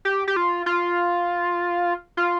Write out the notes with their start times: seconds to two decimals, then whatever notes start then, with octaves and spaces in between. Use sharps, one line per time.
0.05 G4
0.28 G4
0.36 F4
0.66 F4
2.17 F4